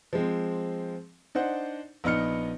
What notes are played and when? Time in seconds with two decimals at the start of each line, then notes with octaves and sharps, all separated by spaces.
0.13 F3 G#3 C4
1.35 D4 D#4 C5 F#5
2.04 A#1 B3 D#4 F6 C#7